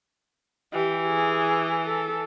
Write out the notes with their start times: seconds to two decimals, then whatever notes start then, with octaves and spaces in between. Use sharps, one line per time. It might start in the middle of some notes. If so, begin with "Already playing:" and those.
0.73 E3 G4
1.07 G#4
1.84 A4